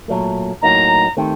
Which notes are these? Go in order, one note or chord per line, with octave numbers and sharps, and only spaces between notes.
A#2 F#3 A3
A2 F#3 A#3 D#4 A#5
D#3 A3 C4 G4